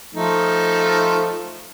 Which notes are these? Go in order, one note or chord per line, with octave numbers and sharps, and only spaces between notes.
F3 A3 D#4